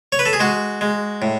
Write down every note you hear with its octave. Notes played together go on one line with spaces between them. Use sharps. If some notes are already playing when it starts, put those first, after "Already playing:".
C#5
B4
A4
G#4
G#3 F#4
G#3
A2